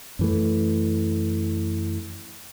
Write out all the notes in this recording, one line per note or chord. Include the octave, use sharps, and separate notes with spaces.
F#2 E3 A3